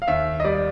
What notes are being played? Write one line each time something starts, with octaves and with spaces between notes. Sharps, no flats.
F5
D#2 E5
D#5
G3 D5